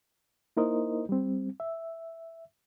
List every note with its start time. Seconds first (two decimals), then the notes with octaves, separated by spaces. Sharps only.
0.57 A#3 D#4 E4 A#4 C5 D#5
1.09 G3 C4
1.60 E5